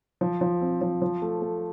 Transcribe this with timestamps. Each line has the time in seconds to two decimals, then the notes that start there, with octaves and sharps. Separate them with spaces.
0.21 F3
0.41 F3
0.61 C4
0.81 F3
1.02 F3
1.22 A3
1.42 A3